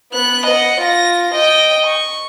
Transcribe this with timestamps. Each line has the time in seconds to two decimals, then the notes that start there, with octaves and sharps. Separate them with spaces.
0.12 B3 F#6
0.46 D#5 F#5
0.80 F4 A#6
1.34 D#5 G5
1.86 C#6